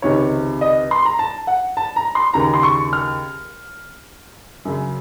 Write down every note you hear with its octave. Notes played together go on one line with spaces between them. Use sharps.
C#2 C3 D#3 C#5
D#5
C6
A#5
A5
F#5
A5
A#5
C6
D#2 C#3 A#5
C6
C#6
F6
F#2 C#3